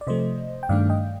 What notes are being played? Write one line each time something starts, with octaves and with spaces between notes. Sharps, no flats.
D5
C3 F3 A3 C5 D#5
G5
G2 D#3 A3 D4 D5 F5
D#5 G5